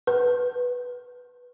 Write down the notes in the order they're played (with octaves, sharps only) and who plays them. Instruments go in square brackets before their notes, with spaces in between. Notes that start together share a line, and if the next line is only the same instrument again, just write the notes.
[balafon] B4